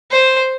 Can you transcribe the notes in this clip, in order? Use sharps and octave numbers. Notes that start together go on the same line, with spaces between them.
C5